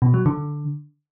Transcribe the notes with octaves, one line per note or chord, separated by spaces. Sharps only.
B2
F#3
D3